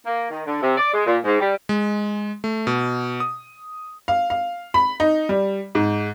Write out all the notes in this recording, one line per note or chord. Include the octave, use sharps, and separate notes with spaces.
A#3
D#3
D3
C3
D5
G#3
A#2
G#2
G3
G#3
A3
B2
D#6
F5
F5
B5
D#4
G3
G#2